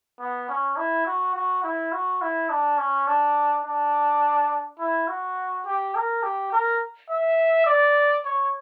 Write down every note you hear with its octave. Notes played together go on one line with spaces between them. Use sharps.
B3
C#4
E4
F#4
F#4
E4
F#4
E4
D4
C#4
D4
D4
E4
F#4
G4
A#4
G4
A#4
E5
D5
C#5